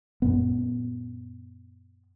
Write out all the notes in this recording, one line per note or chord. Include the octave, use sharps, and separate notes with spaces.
F#2 A#2 B3